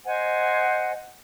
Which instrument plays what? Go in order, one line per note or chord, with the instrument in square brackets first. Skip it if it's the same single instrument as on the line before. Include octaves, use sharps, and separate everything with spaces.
[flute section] C5 D#5 F#5 G#5